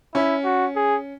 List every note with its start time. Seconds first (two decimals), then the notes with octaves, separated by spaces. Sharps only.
0.14 C#4 E4
0.44 F#4
0.76 G#4